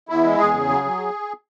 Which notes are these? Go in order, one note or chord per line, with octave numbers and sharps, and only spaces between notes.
E2 E4
G#3
E2 G#4
C#3
F#3
F#3